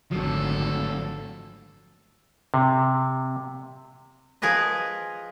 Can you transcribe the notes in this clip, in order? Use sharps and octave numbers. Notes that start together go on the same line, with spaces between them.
G#1 D3 F3 F#3 A3 A4
C3
F3 G#4 A#4 B4 D#5